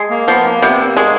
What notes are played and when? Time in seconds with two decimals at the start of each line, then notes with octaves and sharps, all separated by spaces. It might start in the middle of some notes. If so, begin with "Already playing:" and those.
Already playing: G#3
0.10 A#3
0.27 F3 B3
0.45 A#3
0.62 C3 B3
0.79 A#3
0.97 G#3